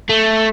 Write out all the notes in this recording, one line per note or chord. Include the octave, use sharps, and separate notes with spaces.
A3